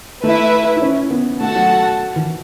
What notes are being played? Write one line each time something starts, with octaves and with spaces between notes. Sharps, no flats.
A3 E4 B4 E5
E4
C#4
B3
A3 F#4 A4 F#5 A5
F#3
E3